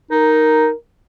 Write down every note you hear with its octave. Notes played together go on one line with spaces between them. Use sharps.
D#4 A#4